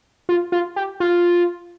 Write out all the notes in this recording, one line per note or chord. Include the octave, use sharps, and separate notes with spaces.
F4
F4
G4
F4